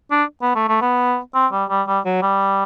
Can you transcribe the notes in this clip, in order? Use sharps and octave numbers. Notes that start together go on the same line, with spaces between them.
D4
B3
A3
A3
B3
C4
G3
G3
G3
F#3
G3